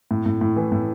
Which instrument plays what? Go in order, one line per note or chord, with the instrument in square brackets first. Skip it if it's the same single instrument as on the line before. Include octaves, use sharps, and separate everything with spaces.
[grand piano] A2
A2
A2
E3
A2